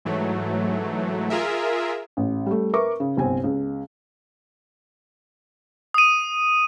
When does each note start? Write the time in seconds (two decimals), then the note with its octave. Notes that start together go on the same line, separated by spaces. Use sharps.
0.05 G#2 E3 F#3 A3
1.30 F4 G#4 A#4 E5
2.17 A1
2.46 G3 A3
2.73 A#4 B4 E5 C#6 D6
3.00 C#3
3.17 G1 C2 C4 G#5
3.44 C#2
5.94 D#6 D#7